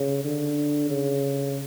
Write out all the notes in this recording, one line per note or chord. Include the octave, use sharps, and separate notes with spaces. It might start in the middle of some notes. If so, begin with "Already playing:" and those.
Already playing: C#3
D3
C#3